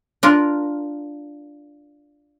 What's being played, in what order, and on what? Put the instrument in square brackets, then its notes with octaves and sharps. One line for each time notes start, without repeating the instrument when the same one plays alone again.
[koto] D4 F4 A#4